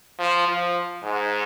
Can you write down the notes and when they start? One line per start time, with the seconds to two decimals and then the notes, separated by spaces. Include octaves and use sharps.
0.19 F3
0.48 F3
1.04 G#2